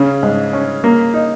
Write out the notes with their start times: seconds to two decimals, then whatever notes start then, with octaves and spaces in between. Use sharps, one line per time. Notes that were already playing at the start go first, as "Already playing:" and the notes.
Already playing: C#3 C#4
0.23 G#2
0.53 C#4
0.84 A#3
1.14 D#4